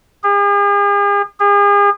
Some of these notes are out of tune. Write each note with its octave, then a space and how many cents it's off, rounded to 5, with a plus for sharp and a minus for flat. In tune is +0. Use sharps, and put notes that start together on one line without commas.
G#4 -45
G#4 -40